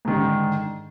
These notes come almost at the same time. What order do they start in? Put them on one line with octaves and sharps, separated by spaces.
G#2 D#3 D3